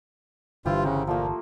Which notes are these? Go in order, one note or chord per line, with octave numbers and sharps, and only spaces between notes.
G1 G2 D3 E3 E4 F4 G4 C5
C#3 G4 A#4 F#5
A#2 F3 A3 A#3